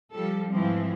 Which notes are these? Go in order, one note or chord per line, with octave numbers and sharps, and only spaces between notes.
F3 G3 A4
G#2 E3 F3 C4